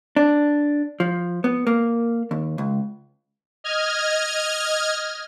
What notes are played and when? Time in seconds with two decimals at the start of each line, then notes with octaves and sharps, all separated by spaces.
0.16 D4
1.00 F3
1.44 B3
1.67 A#3
2.31 D#2
2.58 C#2
3.64 D#5 F6 G#6